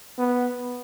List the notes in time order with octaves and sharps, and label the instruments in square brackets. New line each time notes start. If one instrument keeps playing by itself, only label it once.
[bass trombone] B3